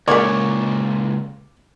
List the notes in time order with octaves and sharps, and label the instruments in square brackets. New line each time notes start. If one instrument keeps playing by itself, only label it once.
[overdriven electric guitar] C#2 A#2 [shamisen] C#3 A#3 [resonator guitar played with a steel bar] C#5 [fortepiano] D5